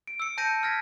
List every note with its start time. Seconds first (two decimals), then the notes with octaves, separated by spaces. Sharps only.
0.07 D7
0.20 E6 C#7
0.38 A5 G6 A#6 C#7 D#7
0.63 F6 G#6 A#6 B6